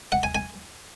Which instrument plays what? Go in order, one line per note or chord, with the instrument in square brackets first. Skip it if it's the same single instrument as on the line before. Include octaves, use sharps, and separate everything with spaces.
[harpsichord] F#5
G#5
G#5